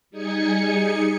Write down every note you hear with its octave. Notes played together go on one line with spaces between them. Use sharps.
G3 D#4 G#4 G#5 C#7